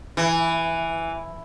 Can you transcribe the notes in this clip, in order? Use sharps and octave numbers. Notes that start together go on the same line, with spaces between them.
E3